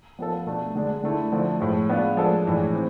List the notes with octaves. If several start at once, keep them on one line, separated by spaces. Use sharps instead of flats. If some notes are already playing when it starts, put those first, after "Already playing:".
F3 B3 F4 A4
B2 A3 D4
D3 G#3 D4
D3 A3 E4
D3 F3 A3
A2 F3 G#3
G#3 B3 D4 F4
F3 G#3 D4 A4
A2 E3 G#3 D4
C4 E4